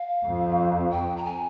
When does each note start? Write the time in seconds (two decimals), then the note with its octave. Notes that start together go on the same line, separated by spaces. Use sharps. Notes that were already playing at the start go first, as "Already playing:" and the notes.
Already playing: F5
0.24 F2
0.91 G5
1.17 A#5
1.25 G#5